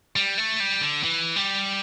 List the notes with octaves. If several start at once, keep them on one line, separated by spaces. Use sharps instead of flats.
G3
A3
G3
D3
E3
G3